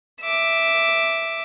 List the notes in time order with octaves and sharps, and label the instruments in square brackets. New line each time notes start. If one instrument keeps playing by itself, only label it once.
[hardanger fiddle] E5 D6